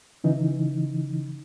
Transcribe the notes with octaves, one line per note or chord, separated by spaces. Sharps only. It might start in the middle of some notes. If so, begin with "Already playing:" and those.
C#3 E3 D#4